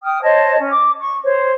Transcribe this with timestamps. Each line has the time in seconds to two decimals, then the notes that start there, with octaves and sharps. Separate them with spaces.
0.03 G5 D#6 F6
0.21 C5 C#5 D#5 A5
0.58 C#4
0.70 D6
0.99 C#6
1.23 C5 C#5